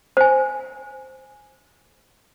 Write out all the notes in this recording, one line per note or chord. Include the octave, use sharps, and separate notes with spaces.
C5 G#5